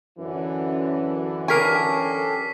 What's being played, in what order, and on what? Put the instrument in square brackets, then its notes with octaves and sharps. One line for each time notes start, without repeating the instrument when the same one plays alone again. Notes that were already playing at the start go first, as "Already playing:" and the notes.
[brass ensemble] F#2 D3 E3
[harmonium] C#4 G4 A4 [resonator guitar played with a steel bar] A#4 G#5 [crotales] C#6 B6 C7